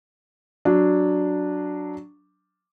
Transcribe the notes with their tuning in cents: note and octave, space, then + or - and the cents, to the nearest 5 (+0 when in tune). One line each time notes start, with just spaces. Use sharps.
F#3 +0 D4 +0